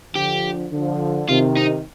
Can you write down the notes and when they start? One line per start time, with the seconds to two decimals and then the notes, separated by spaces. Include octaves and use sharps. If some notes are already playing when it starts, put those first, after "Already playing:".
0.14 D3 F3 G4
0.72 D3 F3
1.29 C3 D#3 F4
1.57 D#4